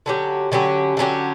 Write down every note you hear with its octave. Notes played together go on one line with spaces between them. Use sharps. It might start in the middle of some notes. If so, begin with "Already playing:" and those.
D3 F#3 C#4 G4
D3 F#3 C#4 G4
D3 F#3 C#4 G4